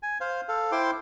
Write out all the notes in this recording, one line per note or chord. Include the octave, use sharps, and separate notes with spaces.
G#5
C5 F5
A4 F5
E4 C5 G5 C6 D6